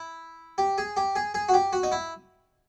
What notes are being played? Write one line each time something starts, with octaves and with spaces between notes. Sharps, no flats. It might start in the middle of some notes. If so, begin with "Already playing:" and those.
Already playing: E4
G4
G#4
G4
G#4
G#4
F#4
G4
F#4
D#4
E4